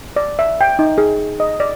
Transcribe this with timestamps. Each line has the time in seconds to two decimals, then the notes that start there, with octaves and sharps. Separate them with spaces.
0.16 D5
0.39 E5
0.61 G5
0.79 D#4
0.98 G#4
1.40 D#5
1.60 D5